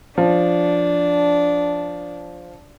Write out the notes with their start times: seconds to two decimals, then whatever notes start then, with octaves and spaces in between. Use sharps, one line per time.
0.18 F3 D4